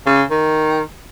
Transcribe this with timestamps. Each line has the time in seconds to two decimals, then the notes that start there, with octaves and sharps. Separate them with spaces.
0.06 C#3
0.31 D#3